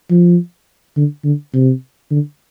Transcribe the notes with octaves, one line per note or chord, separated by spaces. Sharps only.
F3
D3
D3
C3
D3